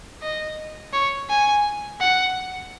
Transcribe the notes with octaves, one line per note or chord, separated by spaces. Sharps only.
D#5
C#5
G#5
F#5